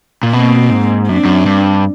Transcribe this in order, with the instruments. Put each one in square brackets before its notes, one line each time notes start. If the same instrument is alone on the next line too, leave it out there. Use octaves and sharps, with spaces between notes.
[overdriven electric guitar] A#2
[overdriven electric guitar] B2 [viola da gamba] A#3 C4
[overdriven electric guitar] G#2
[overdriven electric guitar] F#2 [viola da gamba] C4 D4
[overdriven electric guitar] F#2
G2